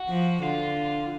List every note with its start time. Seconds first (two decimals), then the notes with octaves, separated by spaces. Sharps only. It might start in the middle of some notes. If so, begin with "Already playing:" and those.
Already playing: F#4
0.09 F3
0.43 D3 F4